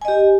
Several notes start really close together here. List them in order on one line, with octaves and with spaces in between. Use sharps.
G#5 D#5 G4